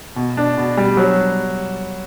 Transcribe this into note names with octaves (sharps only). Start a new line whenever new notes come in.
B2
D4
B2
G3
F#3